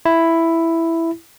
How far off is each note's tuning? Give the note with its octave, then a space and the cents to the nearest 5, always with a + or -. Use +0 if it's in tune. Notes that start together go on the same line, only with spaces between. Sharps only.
E4 +5